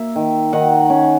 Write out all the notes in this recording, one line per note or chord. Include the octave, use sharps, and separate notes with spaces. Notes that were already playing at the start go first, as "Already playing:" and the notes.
Already playing: A#3 E5
D#3
D#3 F#5
C#4